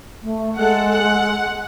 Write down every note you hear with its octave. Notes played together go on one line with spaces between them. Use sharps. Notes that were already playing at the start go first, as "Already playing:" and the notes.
A3
G#3 A4 F#5
F#5